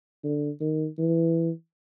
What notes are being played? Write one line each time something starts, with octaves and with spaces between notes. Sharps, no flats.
D3
D#3
E3